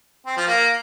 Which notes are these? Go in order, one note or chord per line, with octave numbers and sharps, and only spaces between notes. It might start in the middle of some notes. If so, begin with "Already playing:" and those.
C4
F3
A#3